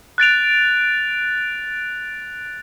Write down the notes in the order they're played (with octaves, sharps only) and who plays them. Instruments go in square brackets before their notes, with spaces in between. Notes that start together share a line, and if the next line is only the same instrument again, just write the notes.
[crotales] F#6 A6 D7 F7